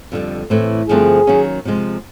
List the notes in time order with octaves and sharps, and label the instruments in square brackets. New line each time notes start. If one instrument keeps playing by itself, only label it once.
[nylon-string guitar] F2 D3 G3
A2 E3 A3 C4
[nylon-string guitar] G2 D3 F3 A3 C4 [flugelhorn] G#4
[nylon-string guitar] D#3 F#3 A#3 C#4
C3 F3 G#3